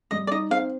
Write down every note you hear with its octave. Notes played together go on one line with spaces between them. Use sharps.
G3 D#5
D5
D#4 D#5
C4 F5